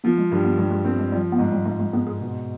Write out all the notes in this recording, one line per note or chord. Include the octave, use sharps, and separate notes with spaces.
F3 B3
G#3
G2
B3
G2 G#3
G#3
B3 C4
G#3
F3 G3
B3
G#2 G#3
G3
G#2 G#3
G#3
G#3 B3
G#4
B2